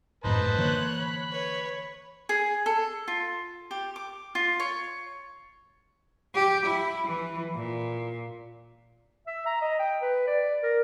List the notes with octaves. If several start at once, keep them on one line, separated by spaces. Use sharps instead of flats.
G#1 F#2 A2 D#4 B4 C5 A5
D3 E3 A#3 C#5 F#6
B5
B4 C#5
G#4
A4
F4
G4
D6
F4
C#5
G4
E4
E3
A#2
E5
A#5
D#5
G5
B4
D5
A#4